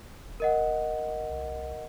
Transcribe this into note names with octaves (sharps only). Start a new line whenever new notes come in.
D#1
A#4 D#5 F#5
G1
C2